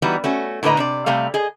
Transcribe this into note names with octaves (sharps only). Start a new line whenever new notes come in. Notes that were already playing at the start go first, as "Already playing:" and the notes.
E3 G3 B3 D#4 F#4
A3 C#4 F#4
A2 D3 A#3 B4 D#5 A#5
C3 D4 D5
C3 G3 A3 F5
G#4 D#5